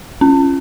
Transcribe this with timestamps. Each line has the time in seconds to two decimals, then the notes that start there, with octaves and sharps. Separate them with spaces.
0.21 C#4